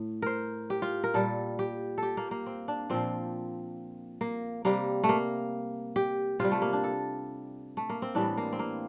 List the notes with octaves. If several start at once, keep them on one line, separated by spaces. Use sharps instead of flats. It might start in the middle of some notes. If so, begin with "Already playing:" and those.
Already playing: A2
A#4 C5
G4
F4
A#4
A#2 G3 A4
G4
G4 A4
A#3
A#3
C4
D4
A#2 F3 C4
A#3
C3 G3 A#3
A3
A#3
G4
C3 G3 F4
A3
A#3
D4
A4
A3
A#3
C4
A2 E3 G3 D4
A#3
C4
A#3